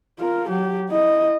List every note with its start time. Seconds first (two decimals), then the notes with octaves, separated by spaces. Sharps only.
0.19 F4 A#4
0.49 F#3 G4
0.89 E4 D#5